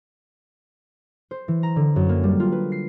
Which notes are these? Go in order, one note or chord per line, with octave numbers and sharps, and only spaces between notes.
C5
E3
A#5
D3
F#2
A#3
G3
F4
B4
C7